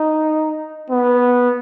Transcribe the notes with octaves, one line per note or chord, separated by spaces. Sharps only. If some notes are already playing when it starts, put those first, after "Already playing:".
Already playing: D#4
B3